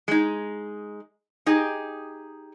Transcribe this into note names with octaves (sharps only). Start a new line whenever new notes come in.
G#3 D#4
D#4 G4 G#4 D#5